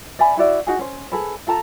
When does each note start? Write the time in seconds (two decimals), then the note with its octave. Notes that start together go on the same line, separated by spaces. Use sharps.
0.19 D5 E5 G#5 B5
0.37 E4 F#4 D5 E5
0.67 D#4 F#4 G#4
0.79 C#4 C5
1.12 G#4 A4 B4
1.47 F4 A4 A5 A#5